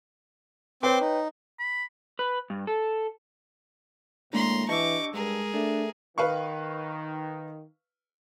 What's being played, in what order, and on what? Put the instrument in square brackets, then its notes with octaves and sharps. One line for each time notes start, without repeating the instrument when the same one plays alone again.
[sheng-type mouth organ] C4 C6 D6 [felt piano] B4 C#5 G5
[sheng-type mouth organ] D#4
[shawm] B5
[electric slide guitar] B4
G2
A4
[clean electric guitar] D#2 [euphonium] A2 [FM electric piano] G#3 A#3 D4 [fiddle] A#5 C6
[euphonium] E3 [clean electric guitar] D4 G4 D#5 [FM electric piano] A5 E6 [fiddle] C#6 D6
[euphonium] G2 [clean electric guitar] G#3 [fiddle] G#4 A#4
[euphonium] A3 [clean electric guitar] D4
[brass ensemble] D#3 [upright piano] B4 F5 C#6